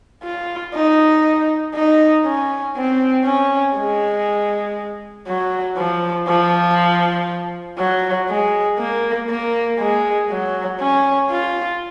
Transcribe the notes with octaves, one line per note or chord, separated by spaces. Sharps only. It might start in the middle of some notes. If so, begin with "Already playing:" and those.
F4
D#4
D#4
C#4
C4
C#4
G#3
F#3
F3
F3
F#3
G#3
A#3
A#3
G#3
F#3
C#4
F4